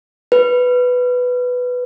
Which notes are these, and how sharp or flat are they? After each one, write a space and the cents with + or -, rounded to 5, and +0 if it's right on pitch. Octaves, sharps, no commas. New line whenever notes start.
B4 +5